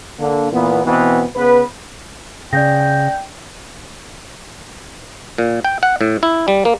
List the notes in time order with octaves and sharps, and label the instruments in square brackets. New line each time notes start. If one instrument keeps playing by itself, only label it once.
[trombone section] D3 A#3
A#2 E3 B3
B2 E3 B3 C4
C#3 B3 B4
[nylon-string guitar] C#3 [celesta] D5 G6 A#6 [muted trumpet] G5
[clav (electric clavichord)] A#2
G5
F#5
A2
E4
G3
A#3